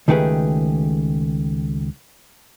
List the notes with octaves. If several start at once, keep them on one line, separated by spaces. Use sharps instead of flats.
C#2 D#3 A3 G4 G#4 B4